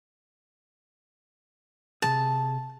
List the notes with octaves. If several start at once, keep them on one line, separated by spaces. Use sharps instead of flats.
C3 F3 G#4 A5